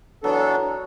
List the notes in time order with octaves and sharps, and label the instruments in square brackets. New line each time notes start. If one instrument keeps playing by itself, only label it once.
[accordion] E3 B3 D4 A4 [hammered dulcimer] F#3